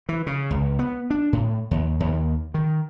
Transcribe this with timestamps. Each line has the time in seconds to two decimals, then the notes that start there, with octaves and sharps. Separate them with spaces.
0.09 E3
0.26 C#3
0.51 C#2
0.79 B3
1.10 D4
1.33 A2
1.71 D#2
2.00 D#2
2.54 D#3